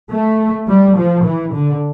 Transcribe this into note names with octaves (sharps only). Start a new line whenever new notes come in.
A3
G3
F3
E3
D3